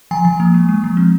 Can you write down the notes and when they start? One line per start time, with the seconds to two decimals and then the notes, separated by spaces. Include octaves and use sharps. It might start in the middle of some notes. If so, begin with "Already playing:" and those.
0.11 F3 G#5
0.25 F3
0.40 A#3
0.54 G#3
0.69 G#3
0.84 F3
0.97 C4